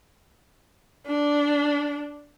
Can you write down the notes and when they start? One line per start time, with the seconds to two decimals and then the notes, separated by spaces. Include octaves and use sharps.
1.07 D4